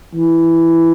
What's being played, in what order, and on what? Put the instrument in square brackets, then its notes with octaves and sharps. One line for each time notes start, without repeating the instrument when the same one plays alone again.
[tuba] E3